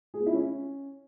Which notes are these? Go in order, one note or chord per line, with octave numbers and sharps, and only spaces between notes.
G#4
B3
E4
C#4